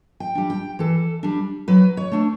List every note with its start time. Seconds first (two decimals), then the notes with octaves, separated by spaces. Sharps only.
0.20 G5
0.35 G3 D4
0.50 G5
0.79 E3 A4
1.23 G3 D4
1.68 F#3 B4
1.97 C#5
2.12 A3 D4